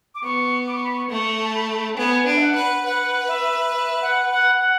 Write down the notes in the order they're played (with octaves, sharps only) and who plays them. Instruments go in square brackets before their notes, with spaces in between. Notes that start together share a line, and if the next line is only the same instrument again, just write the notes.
[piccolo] D6
[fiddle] B3 [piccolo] C#6
[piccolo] D6
C#6
B5
C#6
[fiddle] A3 [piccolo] C#6
[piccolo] A5
B5
[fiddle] B3 [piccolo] G#5
[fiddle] D4
[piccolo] E5
F#5
[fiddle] B4
[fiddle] B4 [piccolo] F#5
[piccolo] E5
E5
F#5
F#5
F#5